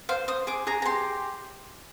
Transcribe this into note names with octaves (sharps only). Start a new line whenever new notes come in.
C5 F5
C5 D#6
G#4 D6
G#4 A#5
A#5
G4 C6